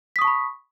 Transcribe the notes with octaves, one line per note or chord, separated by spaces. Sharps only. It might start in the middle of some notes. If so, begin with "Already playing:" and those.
A5 B5 C#6 D#6 B6